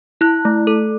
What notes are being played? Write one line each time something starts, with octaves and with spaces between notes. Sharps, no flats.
E4 F#6
A3
A4